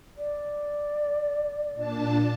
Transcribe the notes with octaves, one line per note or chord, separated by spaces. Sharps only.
D5
A#2 D4 A5